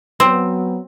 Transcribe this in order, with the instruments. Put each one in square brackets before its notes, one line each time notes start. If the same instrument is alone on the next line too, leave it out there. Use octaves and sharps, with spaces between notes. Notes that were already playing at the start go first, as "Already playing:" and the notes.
[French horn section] F#3 B3 [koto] C4